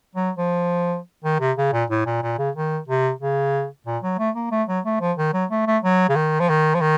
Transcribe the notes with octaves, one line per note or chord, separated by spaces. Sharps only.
F#3
F3
D#3
C3
C#3
A#2
A2
A#2
A#2
C#3
D#3
C3
C#3
A#2
F#3
A3
A#3
A3
F#3
A3
F3
D#3
F#3
A3
A3
F#3
C#3
D#3
F3
D#3
F3
D#3